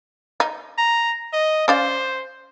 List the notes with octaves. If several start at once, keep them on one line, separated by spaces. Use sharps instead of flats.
D#4
A#5
D#5
C#4 C5 D5 F5